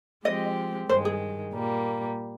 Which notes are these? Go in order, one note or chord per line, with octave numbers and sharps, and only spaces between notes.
F3 G#3 C4 G4 D#5
G2 D#3 G#3 C5
G#4
A#2 G3 A#3